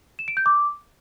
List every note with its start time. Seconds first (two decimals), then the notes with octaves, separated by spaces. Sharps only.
0.19 E7
0.28 D7
0.37 G6
0.46 D6